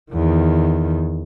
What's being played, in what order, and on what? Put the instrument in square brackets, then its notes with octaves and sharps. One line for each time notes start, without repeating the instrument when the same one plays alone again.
[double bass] E2 D#3